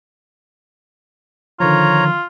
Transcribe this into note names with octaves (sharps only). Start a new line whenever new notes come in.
D3 D#3 F3 F4 C#5 A#5